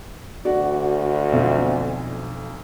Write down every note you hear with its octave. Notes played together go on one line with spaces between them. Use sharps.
D2 F#4 D5
B1 F2